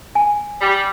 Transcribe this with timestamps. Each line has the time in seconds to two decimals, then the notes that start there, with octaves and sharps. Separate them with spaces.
0.15 G#5
0.61 G3